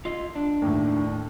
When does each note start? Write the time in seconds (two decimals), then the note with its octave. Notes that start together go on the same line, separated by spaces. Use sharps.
0.05 F4 D#5
0.35 D4
0.62 D#2 A2